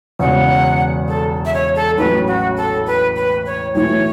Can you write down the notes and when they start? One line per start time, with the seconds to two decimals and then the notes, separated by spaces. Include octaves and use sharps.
0.19 E1 E2 C#3 F#5
1.08 A4
1.45 E5
1.54 C#5
1.76 A4
1.98 A1 A2 F#3 C#4 B4
2.27 F#4
2.57 A4
2.86 B4
3.16 B4
3.46 C#5
3.75 B1 A2 E3 A3 E4 C#5